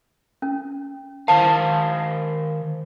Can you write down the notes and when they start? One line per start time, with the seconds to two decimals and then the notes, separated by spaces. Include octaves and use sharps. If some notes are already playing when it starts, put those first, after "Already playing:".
0.42 C#4
1.28 D#3 C5 F5 A5